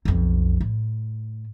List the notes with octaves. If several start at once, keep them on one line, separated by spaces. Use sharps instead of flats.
B1 F2
A2